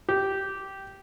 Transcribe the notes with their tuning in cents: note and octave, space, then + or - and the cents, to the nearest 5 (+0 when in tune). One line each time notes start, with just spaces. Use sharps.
G4 -10